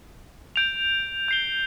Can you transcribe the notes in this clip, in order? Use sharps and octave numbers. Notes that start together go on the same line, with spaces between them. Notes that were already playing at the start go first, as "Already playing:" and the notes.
G6 D7 F7
G6 C7 G7